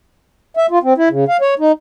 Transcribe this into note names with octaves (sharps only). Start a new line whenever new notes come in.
E5
F4
C4
E4
C#3
F5
C#5
D#4